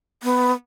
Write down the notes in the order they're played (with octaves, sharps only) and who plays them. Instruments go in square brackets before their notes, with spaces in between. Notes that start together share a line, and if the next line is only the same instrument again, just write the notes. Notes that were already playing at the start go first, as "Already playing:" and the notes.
[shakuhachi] B3